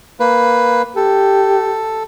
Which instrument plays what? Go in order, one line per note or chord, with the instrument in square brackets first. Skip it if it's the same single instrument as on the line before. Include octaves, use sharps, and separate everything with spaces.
[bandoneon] A#3 B4
[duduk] G4 [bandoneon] A4